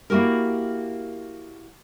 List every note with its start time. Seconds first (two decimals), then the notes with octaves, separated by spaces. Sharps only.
0.10 A#3 E4 F#4 G4 A#4